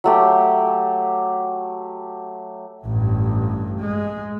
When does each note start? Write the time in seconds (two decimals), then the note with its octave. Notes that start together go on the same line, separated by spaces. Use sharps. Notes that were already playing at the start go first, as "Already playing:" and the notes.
0.04 F#3 A3 G4
2.84 A1 G2
3.79 G#3